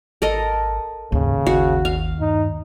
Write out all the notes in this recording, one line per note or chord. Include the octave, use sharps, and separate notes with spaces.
G#1 A4 A#4 D#5
D#2 G#2 C#3
G#1 F#4
F5
G2 D#4